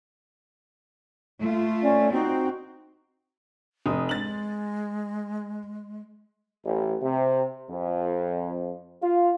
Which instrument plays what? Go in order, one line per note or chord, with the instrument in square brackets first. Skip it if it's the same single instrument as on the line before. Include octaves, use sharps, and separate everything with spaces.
[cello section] A3 F4
[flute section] C#4 D5
[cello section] C4 [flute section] D#4 F#4 G5
[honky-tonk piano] F1 D#6
[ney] G#3 [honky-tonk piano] A6 F#7
[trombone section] A1
C3
F2
F4